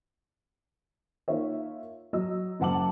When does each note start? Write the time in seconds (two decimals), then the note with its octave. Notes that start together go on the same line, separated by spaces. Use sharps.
1.28 A#3 D#4 F4 C#5 E5
2.13 F#3 D#5 E6
2.60 F#1 F#2 F#5 A5 D6 F#7